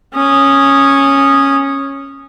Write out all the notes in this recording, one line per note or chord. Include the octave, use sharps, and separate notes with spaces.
C#4 D#6